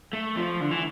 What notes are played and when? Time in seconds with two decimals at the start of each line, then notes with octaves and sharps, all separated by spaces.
0.13 A3
0.36 F3
0.61 D3
0.71 E3